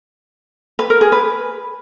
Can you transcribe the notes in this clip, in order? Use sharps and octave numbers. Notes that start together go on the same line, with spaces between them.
B4
A#4
G#4
B4